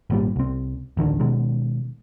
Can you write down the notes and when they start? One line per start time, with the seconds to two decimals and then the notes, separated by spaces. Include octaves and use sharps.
0.10 G#1 A#2 G3
0.36 C2 C4
0.97 A1 D2 D3 D#3
1.20 B2 D#3 G#3